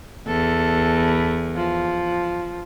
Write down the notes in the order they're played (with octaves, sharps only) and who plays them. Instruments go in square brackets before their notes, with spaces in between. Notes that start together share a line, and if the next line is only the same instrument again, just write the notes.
[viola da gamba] E2 [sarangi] A4
[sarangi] F3